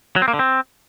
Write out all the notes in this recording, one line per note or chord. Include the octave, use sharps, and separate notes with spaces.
F#3
C4
A#3
D3
C4